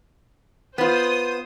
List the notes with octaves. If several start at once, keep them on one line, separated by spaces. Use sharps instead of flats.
B3 F4 C5 D#6